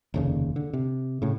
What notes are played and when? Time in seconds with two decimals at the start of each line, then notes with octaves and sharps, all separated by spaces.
0.14 F1 D#2 C#3
0.56 D3
0.73 C3
1.22 A2 C#3